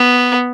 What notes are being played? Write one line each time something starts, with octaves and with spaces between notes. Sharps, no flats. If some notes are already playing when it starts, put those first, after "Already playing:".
Already playing: B3